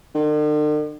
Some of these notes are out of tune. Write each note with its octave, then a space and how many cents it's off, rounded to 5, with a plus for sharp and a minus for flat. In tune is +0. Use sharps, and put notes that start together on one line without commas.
D3 +45